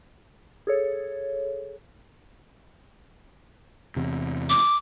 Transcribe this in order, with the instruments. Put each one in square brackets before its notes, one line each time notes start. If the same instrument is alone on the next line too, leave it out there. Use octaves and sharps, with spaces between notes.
[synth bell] G#4 A4 C#5
[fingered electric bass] E2 C3
[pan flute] D6